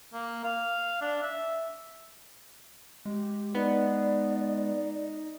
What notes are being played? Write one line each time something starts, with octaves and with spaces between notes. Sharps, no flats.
A#3
F5
D4
E5
G#3 G4
B3 D#4 D5